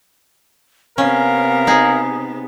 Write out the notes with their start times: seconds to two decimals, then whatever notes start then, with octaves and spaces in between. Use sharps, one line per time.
0.98 C3 B3 C#4 A#4 F5
1.67 D#4 G#4